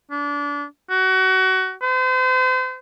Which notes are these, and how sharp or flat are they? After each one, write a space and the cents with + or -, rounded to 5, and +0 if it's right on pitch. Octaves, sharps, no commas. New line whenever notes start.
D4 -25
F#4 +25
C5 -40